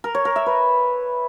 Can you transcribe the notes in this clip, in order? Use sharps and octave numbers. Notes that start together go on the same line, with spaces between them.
A#4
C#5
A#4
E5
B4